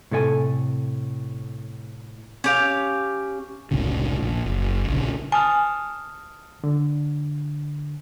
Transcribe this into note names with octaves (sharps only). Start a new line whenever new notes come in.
A2 C3 A4 C#5 G#5
C#4 G4 F5
E1 C2 A2 C#3
A#1
F#1
A#1 C#3
G#5 A5 D#6 F6
D3